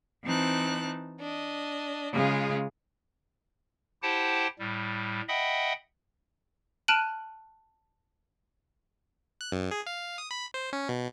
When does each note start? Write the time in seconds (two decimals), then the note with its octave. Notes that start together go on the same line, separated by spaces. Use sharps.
0.25 E3 C4 D#4 A5 F#6
1.20 D4 D#5
2.13 C#3 G#3 F4 G#4
4.02 E4 G4 C5 F#5 G5 A5
4.59 A2 G3
5.28 D#5 E5 F#5 G5 B5 D#6
6.88 A5 F6 F#6 D7 D#7 F#7
9.41 F#6
9.52 F#2
9.71 G#4
9.86 F5
10.18 D#6
10.31 B5
10.54 C5
10.73 C#4
10.89 B2